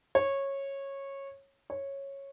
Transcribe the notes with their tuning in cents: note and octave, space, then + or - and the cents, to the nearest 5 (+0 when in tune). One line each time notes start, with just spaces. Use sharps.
C#5 -15
C#5 -10